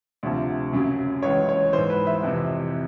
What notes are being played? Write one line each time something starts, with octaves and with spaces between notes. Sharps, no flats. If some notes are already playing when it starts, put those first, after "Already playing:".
D2 C3 F3
F#2 C#3 F#3
C#2 C#3 E3 C#5
C#5
G#2 E3 C5
B4
E5
F2 C3 E3